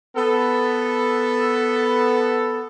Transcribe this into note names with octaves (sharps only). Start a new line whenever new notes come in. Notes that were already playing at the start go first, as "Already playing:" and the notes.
B3 A4